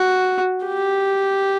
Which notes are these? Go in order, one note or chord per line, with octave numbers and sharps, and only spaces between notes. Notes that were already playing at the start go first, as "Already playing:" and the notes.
Already playing: F#4
G4